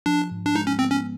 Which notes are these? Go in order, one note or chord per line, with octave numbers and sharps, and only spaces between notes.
F3 D4
G#2
D4
G#3 D#4
C#4
B3 C4
C#4